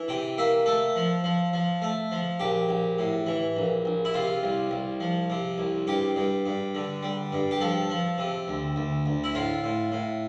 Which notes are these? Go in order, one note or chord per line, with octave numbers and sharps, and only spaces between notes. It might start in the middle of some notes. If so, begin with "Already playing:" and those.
Already playing: E3
C3 G5
A#3 E5
A3 A4
F3
F3
F3
A3
F3
A#1 G4
A#1
A2
E3
A#1
A#1
E4
C3 F4
C2
C2
F3
C3
C2
G2 G4
G2
G2
D3
G3
G2
G4
F3 A4
F3
C3
D2
D2
D2
E4
A2 F4
A2
A2